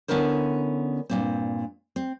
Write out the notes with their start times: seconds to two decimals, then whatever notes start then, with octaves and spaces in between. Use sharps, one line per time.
0.08 D3 B3 C#4 E4 A#4 C5
1.10 G2 A#2 C4
1.96 C4